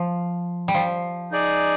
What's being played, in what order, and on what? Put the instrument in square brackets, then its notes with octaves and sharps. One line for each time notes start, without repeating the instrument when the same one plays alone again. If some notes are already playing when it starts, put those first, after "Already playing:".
Already playing: [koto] F3
G3
F3
[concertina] D#4 G#4 D5